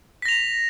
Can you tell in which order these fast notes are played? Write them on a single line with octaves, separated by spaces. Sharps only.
B6 A#6 F7